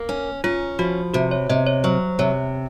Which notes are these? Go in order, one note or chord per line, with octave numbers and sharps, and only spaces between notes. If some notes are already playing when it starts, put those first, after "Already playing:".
Already playing: A#3
C#4
C#4 F4
F3 F#4
C3 F#4
C#5
C3 D#5
C#5
F#3 C5
C3 C#5